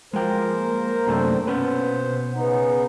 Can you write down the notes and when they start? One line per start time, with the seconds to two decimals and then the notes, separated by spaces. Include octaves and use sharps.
0.13 F3 G#3 A#4 C5 G5
0.48 A#3
1.07 F#2 C3 A3 C4 D4 C5
1.47 B2 B3 C#4 B4 C5
2.35 C#3 B3 D#4